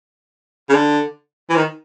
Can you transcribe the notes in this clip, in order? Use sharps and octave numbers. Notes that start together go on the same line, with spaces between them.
C#3
D3
E3
D#3